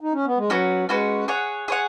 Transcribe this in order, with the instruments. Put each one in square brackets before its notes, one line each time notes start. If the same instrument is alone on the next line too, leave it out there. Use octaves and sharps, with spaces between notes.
[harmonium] D#4
C#4
B3
G#3
[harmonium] F#3 [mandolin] C#4 F#4 B4
[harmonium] G#3 [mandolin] C#4 F#4 B4
[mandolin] G#4 C#5 F#5
G#4 C#5 F#5